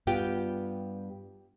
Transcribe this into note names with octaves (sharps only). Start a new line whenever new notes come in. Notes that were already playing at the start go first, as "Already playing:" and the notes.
G2 B3 F4 G4 G5